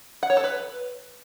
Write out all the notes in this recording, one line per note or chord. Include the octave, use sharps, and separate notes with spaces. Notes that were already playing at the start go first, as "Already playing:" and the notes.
F#5
C#5
A4
B4